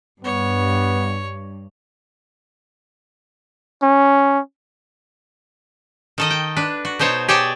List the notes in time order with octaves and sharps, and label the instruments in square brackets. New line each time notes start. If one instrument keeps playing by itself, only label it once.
[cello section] G2 [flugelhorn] B3 [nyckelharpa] C#5
[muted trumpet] C#4
[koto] D#3 A4 D#5
G5
D4 B4
F#4
B2 D#4 C5 C#5 A5
G4 G#4 C#5 D5 G5 A5